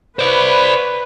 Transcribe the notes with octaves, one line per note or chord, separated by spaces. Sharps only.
B4 C5 D5